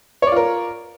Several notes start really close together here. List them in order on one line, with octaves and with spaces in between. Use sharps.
C#5 D5 F4 A#4